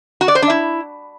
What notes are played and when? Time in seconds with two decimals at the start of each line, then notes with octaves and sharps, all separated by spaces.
0.21 F#4
0.28 D5
0.35 C5
0.42 D4
0.50 E4